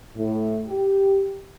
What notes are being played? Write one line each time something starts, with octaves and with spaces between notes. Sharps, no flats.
A2
G4